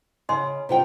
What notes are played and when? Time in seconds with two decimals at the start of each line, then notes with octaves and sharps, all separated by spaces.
0.29 C#3 D#5 G#5 C6
0.69 C3 F4 G5